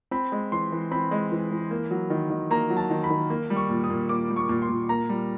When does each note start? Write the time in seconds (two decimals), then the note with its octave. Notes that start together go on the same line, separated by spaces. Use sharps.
0.11 C4 B5
0.32 G#3
0.52 E3 C6
0.72 E3
0.91 C4 B5
1.11 G#3
1.32 E3
1.51 E3
1.71 A#3
1.91 F#3
2.10 D#3
2.30 D#3
2.51 A#3 A#5
2.70 F#3
2.77 A5
2.90 D#3
3.04 B5
3.10 D#3
3.30 A#3
3.50 G3
3.56 C#6
3.70 A#2
3.84 D#6
3.90 A#2
4.09 A#3 D6
4.30 G3
4.36 C#6
4.49 A#2
4.62 C6
4.69 A#2
4.89 A#3 A#5
5.09 G3